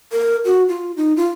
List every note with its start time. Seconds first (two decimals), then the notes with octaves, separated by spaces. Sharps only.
0.12 A#4
0.45 F#4
0.68 F4
0.97 D#4
1.17 F4